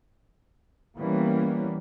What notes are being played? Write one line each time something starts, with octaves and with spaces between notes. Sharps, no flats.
E3 G3 A#3 B3 C#4